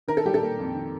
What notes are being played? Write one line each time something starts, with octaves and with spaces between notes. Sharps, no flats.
D#3 A#4
A4
G3 G4
A4
A#3
F2
D#3